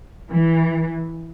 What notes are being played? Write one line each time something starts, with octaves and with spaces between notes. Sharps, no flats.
E3